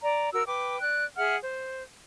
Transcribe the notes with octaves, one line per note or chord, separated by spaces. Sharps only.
D5 A#5
F#4 A#4 E6
B4 G5 D6
D5 F#6
G#4 E5 F#5 F6
C5